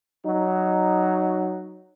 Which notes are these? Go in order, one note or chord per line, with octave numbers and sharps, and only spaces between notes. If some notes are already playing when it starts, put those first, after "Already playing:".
F#3 D#4